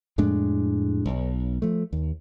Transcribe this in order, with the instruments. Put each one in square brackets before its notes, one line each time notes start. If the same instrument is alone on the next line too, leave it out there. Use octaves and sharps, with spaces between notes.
[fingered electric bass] F2 A2 G#3 D4
B1
F3 A3
D#2